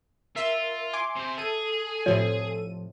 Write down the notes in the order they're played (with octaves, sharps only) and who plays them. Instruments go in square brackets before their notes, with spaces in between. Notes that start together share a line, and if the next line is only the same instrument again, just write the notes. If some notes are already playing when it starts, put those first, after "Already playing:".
[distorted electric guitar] F4 [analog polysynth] A#4 [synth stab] E5
[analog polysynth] G#5 C6 D6
[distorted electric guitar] C3 C5
[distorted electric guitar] G#4 [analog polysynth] A4 D#7
[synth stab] A2 C3 F3 [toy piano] C#5